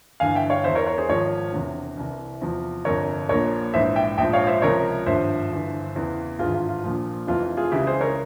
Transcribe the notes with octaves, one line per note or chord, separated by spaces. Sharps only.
G1 G2 E3 F5 G#5
E5 G5
C#5 F5
E2 E3 C5 E5
A#4 C#5
A#4 C#5
G#4 C5
G#1 G#2 F3 A#4 C#5
E1 E2 C3
C2 C3 E3
E2 C3 F3
G1 F2 C3 A#4 C#5
A#1 A#2 F3 A#4 C#5
A#1 G#2 E3 C5 E5
E5 G5
A#1 G#2 F3 E5 G5
C#5 F5
C5 E5
C#2 C3 F3 A#4 C#5
G#1 G2 F3 C5 E5
G1 G2 E3
E2 C#3 E3
G#1 G2 E3 F4 G#4
F4
F4
A#1 A#2 F3
F1 F2 C3 E3 F4
F4 G#4
C#2 C#3 E3 E4 G4
G#4 C5
A#4 C#5